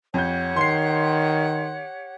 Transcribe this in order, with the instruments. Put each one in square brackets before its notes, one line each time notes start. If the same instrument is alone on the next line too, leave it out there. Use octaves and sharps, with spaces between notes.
[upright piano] F2 G6 [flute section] G4 C#5 F#5
[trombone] D#3 [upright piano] C6 C7